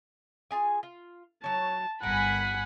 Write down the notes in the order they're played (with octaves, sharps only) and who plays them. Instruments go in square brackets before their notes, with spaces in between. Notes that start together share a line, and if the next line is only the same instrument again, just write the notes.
[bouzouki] F4 G#4 G#5
F4
[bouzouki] F#3 C#5 [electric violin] A5
[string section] G1 G#5 B5 [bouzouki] A#4 [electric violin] F#5